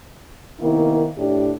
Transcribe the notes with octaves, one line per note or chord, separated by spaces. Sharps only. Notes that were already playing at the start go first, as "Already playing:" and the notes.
C3 D#3 A#3 B3 E4
A2 D4 G4